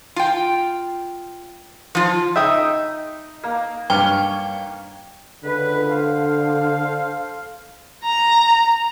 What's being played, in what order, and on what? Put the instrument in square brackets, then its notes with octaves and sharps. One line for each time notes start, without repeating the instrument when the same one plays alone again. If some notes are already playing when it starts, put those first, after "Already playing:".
[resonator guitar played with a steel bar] F4 G5
F3 F4
[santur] D#4 [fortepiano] E5 G5 D#6
[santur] A#3
[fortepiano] G2 F6 [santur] C#5 [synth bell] G5
[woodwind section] C#2 B4 [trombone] D3
[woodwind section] A4 C5 F5
[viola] A#5